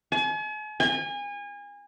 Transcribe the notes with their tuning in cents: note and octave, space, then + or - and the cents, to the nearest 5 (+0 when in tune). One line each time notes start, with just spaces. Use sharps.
G#5 +45
G#5 -30